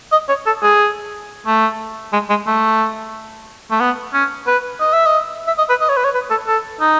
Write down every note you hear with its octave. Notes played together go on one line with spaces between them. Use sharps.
D#5
C#5
A4
G#4
A3
G#3
G#3
A3
A3
B3
C#4
B4
D#5
E5
D#5
E5
D#5
B4
D#5
C#5
B4
C#5
B4
A4
A4
D#4